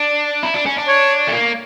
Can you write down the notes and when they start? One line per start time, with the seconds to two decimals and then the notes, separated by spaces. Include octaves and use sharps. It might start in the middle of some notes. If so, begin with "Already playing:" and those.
Already playing: D4
0.43 E4
0.54 D4
0.66 C#4
0.78 D4
0.88 C#5
1.28 A3
1.33 A#3